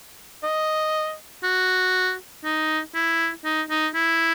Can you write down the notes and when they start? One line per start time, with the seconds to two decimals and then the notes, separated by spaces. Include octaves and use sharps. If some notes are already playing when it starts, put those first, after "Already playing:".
0.43 D#5
1.43 F#4
2.44 D#4
2.94 E4
3.44 D#4
3.70 D#4
3.94 E4